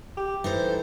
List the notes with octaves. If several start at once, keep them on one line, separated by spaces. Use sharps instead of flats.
G4
E3 D#4 A4 C5